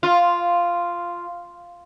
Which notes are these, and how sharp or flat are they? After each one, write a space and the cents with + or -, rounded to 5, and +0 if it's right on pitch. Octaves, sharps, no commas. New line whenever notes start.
F4 -5